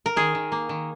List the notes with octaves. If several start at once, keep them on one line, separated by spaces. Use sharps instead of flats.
A#4
D#3 G#4
D#3
A#3
D#3